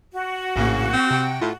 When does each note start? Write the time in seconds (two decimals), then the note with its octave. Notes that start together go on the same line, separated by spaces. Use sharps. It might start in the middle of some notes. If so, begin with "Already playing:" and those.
0.12 F#4
0.56 A#1 A2 C#3 A#3
0.93 C4
1.11 C3 G5
1.41 A2 F4